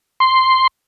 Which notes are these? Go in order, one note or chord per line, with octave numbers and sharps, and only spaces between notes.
C6